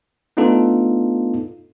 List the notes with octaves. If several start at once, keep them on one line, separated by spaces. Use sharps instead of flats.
A3 B3 D4 D#4 F4 A4